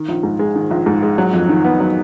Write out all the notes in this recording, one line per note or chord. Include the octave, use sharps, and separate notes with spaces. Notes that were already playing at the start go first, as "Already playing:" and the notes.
Already playing: D#3
A#1
G#2
G#3
D#3
A#1
G#2
G#3
F#3
F2
D#3
B3
F#3